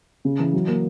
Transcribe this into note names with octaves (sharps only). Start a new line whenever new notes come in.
C#3
E3
F#3
A#3